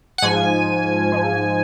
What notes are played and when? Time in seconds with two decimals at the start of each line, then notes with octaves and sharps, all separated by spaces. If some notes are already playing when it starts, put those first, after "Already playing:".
0.18 F#5
0.22 G#2 F3 G#5
1.12 G#2 F3